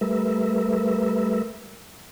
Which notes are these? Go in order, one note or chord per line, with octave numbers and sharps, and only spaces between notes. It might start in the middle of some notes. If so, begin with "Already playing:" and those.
G3 A3 A#4 B4 E5